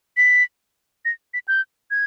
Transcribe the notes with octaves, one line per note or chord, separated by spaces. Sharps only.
B6
A#6
B6
G6
G#6